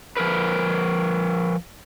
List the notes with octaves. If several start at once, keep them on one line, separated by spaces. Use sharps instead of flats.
F3 A#4 B4